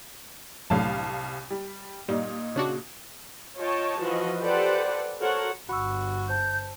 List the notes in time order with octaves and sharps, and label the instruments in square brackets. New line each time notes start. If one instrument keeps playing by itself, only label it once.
[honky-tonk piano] C2 F5 A5 [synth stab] F#2 A2 D3
[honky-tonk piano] G3
[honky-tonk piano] A#2 D#4 [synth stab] G3
[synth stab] C#3 D4 F#4
[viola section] F4 C#5 D#5 G5 A5
E3 F3 F#4 D#5
G4 A4 B4 C5 D5 F#5
F#4 A4 A#4 C5 C#5 F#5
[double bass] G1 G2 [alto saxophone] F#4 [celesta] B5 C#6 E6
[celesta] C5 A5 [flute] G6